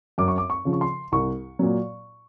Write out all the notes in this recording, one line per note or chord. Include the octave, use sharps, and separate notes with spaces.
F#2 D6
C#6
D6
C#6
C#3 F3
C#6
C6
C2 C#6
A#2 F#3